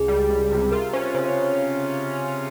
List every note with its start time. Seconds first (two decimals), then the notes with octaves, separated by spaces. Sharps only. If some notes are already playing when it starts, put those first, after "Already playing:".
Already playing: C#2 G#4
0.08 G3
0.30 C#2
0.51 C3
0.72 F4 A#4
0.93 C#4 C5
1.15 C#3 C5
1.26 C#5